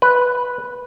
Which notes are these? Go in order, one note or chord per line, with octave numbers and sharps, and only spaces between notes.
B4